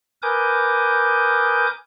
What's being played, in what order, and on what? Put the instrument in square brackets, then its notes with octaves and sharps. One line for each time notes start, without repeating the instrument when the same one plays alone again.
[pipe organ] A#4 B4 G#5 D6 D#6 G6